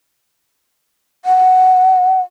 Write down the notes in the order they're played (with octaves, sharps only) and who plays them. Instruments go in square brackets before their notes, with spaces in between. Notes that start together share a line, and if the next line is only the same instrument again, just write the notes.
[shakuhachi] F#5